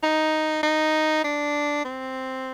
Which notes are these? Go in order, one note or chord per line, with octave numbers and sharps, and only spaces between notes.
D#4
D#4
D4
C4